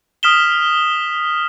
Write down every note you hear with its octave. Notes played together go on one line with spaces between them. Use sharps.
D#6 F6 B6 E7 G7